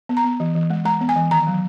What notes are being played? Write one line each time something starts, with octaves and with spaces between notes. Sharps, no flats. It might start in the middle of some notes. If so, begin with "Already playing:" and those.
B3
A#5
B3
E3
E3
G#3
G#3 A#5
B3
G#5
E3
D#3 A#5
F#3